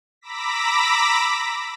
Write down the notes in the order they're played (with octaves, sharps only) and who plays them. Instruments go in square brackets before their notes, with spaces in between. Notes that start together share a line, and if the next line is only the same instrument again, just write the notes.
[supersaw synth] A#5 B5 D6 E6 A#6 B6